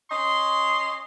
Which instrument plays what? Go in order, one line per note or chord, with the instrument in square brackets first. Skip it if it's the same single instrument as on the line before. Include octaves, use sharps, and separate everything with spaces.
[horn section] C#4 D#5 C6